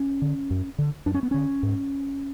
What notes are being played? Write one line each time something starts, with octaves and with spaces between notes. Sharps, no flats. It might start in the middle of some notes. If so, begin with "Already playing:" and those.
Already playing: C#4
D3
F#2
D3
F#2 D4
C#4
B3
D3 C#4
G#2